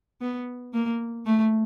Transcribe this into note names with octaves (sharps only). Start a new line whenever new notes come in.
B3
A#3
A3